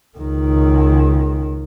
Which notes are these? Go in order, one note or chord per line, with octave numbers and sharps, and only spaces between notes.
C#2 D#3